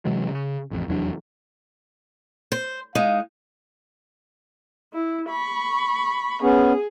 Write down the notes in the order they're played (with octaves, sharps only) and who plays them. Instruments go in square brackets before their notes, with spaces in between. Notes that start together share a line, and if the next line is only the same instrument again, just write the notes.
[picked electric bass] C3 E3 F#3 G#3
C#3
A1 F2
F1 E2 F#3 D4
[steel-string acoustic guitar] C5
[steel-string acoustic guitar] G#3 D#4 [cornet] F5
[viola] E4
B5 C#6
[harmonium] B3 C#4 [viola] G#4